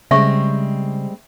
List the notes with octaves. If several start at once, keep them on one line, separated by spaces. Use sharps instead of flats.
C#3 G3 G#3 C4 E5 C#6